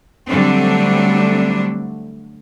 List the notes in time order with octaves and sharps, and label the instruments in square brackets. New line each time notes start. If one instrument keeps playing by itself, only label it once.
[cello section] D3 F#3 G3 A3 C4 D4